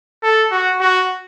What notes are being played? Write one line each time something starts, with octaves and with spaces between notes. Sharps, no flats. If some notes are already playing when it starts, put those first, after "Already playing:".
A4
F#4
F#4